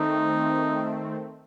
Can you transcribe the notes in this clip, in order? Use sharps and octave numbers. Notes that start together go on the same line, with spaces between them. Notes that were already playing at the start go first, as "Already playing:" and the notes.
Already playing: D#3 A3 C4 D#4